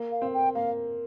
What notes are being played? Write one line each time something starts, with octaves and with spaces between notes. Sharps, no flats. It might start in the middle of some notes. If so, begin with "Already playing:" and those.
Already playing: A#3
F5
C4
G5
A#3 F5